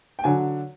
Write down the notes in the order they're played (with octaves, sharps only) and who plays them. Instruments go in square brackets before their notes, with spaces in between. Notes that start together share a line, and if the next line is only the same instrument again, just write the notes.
[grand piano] G5
D3 F#3 G#5